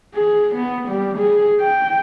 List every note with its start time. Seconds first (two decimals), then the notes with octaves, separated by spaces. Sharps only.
0.15 G#4
0.55 B3
0.88 G3
1.18 G#4
1.60 G5